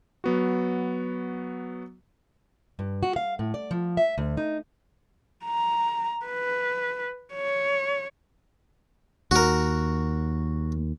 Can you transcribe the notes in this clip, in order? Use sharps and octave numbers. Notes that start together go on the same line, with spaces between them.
F#3 B3 F#4
G2
F#4
F5
A2
D5
F3
E5
D2
D#4
A#5
B4
C#5
D#2 F#4 A#4